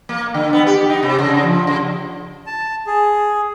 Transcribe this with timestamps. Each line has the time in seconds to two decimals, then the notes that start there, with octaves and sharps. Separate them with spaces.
0.09 A#3
0.34 D3
0.53 B3
0.67 G4
0.89 D#4
1.03 C3
1.19 C#3
1.43 F3
1.67 C#3
2.46 A5
2.87 G#4